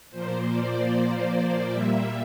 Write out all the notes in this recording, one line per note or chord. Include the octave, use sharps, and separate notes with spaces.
A#2 F3 A#3 C5
D5
A#2 G3 A#3 E5